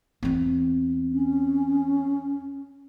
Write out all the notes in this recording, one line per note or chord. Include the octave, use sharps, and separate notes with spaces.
E2 C4
C#4